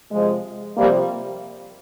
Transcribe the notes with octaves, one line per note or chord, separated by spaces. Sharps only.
C3 F3 G#3
C3 F3 G3 A#3